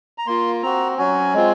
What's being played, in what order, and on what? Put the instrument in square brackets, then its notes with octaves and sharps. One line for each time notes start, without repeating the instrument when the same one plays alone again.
[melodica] A#5
A#3 F4 C6
C4 F#4 A#5
F#3 C#4 F#4 G#5
G#3 C4 F4